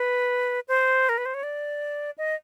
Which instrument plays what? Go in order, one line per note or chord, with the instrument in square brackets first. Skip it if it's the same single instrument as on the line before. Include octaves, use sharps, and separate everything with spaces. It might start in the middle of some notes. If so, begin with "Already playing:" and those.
Already playing: [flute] B4
C5
A#4
B4
C5
C#5
D5
D#5